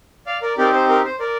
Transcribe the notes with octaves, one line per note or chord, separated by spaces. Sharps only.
D5 F5
A#4 D5
C4 D#4 G4 A#4 D5
C5
A#4
C5
A#4 D5